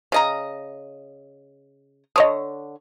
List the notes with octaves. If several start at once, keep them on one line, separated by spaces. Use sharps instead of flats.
C#3 D#5 A#5
D3 C#5 D#5 D#6